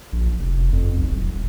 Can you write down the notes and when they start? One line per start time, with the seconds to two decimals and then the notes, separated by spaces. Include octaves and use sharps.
0.13 A#1
0.39 F1
0.73 F2
0.97 B1
1.09 D#1